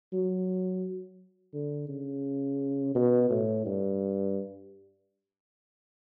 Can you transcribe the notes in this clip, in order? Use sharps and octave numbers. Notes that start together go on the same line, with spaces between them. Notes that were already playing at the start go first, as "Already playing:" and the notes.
F#3
D3
C#3
B2
A2
G2